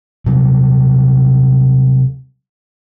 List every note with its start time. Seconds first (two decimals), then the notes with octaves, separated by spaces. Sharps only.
0.26 C3 F#3 G3